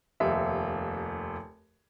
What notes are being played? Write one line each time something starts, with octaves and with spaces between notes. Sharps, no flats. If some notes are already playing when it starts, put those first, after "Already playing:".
F1 D#2 E5